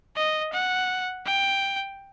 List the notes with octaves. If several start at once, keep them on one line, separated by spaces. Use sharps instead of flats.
D#5
F#5
G5